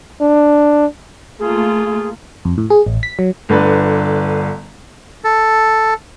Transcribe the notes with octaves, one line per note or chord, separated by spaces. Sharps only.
D4
A3 A#3 F4 G#4
F2
A2
G#4
A1
B6
F#3
G1 D3 B4
A4